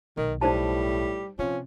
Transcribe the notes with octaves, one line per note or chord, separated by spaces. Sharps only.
B1 D#3
A2 G3 D#4 C5 A5
C3 F3 C#4